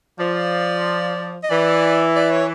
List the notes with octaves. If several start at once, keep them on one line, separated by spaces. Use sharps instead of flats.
F3 D5
D#5
E3 D5
D5
C#5